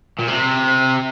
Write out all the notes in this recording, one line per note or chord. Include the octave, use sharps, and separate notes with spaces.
A#2
C3